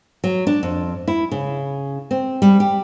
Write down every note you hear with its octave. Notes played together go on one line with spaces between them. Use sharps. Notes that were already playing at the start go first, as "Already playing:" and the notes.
F#3
D4
F2
E4
C#3
C4
G3
G4